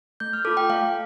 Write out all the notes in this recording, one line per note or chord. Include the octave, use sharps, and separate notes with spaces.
A3 G6
F6
F4 A4 D6
G5
A3 F5